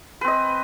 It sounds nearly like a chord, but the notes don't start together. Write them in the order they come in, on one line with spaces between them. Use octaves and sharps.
B4 C4 D#5